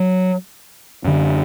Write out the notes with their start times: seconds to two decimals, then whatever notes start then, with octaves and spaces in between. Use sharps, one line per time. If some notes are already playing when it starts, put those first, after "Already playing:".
Already playing: F#3
1.04 F#2 D3